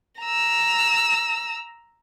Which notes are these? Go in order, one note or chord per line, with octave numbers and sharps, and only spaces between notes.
A#5 E6